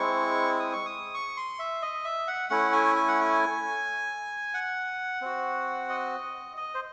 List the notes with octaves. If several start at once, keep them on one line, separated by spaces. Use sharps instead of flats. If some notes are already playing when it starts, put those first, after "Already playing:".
Already playing: G#3 C4 E4 C#6
D#6
C#6
D#6
C#6
C6
E5
D#5
E5
F#5
A3 C#4 E4 F#5
G#5
G#5
F#5
G#5
F#5
C4 F#4
D#5
D#5
C5